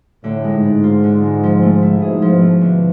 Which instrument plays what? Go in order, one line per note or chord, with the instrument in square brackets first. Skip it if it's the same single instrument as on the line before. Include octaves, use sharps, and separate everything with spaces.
[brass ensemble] A2 [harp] D3
[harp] G#3
[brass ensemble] G#2
[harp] D4
F4
D3
G#3
F3
A3
E4
[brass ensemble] G#2 B2 [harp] G#4
[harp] F3
[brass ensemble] G#2 B2
[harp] A3
D3